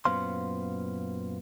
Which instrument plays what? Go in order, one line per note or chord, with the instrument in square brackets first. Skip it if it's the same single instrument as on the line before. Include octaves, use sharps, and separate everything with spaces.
[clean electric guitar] F#2 A#2 B3 C5 F5 C6